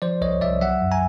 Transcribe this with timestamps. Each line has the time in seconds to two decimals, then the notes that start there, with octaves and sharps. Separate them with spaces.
0.02 F3 C5 D5
0.21 C2 C#5 D#5
0.41 C2 D5 E5
0.61 F#3 E5 F#5
0.82 F#2
0.91 G#5 A#5